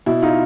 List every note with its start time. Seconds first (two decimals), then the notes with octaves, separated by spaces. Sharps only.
0.06 B2 E4
0.22 D#4 F4